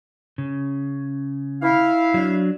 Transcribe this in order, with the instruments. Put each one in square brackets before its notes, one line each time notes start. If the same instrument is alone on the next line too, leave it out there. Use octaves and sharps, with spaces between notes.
[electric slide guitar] C#3
[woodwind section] E4 F5
[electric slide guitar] F#3 D4